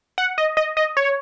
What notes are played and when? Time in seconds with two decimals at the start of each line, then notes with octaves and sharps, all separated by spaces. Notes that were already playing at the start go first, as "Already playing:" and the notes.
0.18 F#5
0.38 D#5
0.57 D#5
0.77 D#5
0.97 C#5